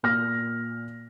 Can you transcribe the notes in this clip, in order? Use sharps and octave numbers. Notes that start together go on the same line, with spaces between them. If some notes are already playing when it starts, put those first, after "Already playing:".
A#2 F6 A#6